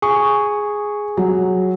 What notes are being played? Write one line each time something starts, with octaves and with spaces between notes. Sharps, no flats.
G#4 C#6
F#3